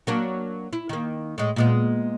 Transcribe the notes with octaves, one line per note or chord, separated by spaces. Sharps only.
F#3 A#3 D4
E4
D#3 A#3
A2 G#3
A#2 G#3 B3